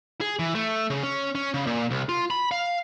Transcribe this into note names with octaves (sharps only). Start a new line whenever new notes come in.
G#4
E3
A3
C#3
C#4
C#4
C#3
A#2
C2
F4
B5
F5